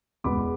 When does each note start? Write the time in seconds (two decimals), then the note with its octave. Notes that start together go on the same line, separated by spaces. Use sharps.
0.24 E1 E2 B2 G#3 B3 B5 D6